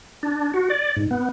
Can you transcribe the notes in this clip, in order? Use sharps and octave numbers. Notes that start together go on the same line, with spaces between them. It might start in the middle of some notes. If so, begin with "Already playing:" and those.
D4
F#4
D5
G#2
B3